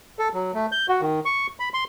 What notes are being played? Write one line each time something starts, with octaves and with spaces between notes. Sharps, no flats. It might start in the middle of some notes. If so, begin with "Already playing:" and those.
A4
F#3
A3
G6
F#4
D#3
C#6
B5
C6